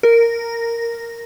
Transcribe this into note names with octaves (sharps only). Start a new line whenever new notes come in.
A#4